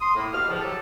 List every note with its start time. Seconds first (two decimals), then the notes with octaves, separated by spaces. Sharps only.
0.01 C6 D#6
0.15 A2 A#3
0.33 B2 F#4 G4 F5 F6
0.48 D2 A2 C#3 F3
0.61 F#3 G4 A4